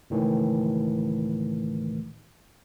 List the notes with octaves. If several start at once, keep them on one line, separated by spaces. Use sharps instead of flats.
C#2 A2 D#3 E3